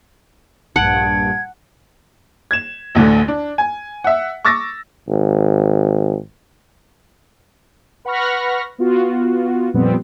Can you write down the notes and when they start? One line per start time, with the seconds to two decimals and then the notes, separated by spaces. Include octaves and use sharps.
0.76 A#1 G2 F#5 A5 G#6 D7
2.51 G#6 E7
2.95 A1 D2 D3 A3
3.28 D4
3.58 G#5
4.04 E5 F#5
4.45 C#6 D6 E6 A6 A#6
5.08 G#1
8.05 B4 F#5 B5 C#6 F6 A#6
8.78 B3 F4 F#4
9.74 F2 A#2 G3 B3 C4